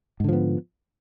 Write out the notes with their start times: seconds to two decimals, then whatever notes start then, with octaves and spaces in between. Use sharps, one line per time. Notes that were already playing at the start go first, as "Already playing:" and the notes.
0.20 G#2
0.24 D3
0.29 F3
0.33 B3